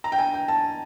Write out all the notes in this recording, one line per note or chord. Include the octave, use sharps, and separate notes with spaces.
A#5
G5
G#5
G5
A5